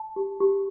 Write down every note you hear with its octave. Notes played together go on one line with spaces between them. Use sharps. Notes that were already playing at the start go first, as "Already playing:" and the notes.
Already playing: A5
G4
G4